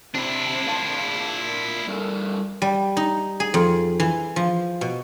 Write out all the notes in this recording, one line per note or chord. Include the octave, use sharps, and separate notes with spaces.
C3 D4 E4
A#2 F5 A5
G3 A4 A#4
G3
D#4
G#4
F2
E3
F3
B2